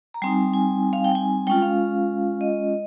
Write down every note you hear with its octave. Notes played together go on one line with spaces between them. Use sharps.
A#5
G3 C4 D#4 G#5
G#5
F5
G5
G#5
G#3 C#4 F4 G5
F5
D#5